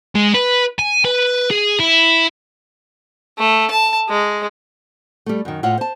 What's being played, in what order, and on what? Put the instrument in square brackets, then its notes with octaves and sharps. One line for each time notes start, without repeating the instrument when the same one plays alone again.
[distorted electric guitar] G#3
B4
G#5
B4
G#4
E4
[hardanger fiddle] A3
A5
G#3
[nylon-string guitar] G3 A3
F#2 D#3
A2 F4 C#5 F#5
C5 A5